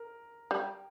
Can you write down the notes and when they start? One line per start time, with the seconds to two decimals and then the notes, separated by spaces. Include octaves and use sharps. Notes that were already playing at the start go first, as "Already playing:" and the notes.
Already playing: A#4
0.51 G3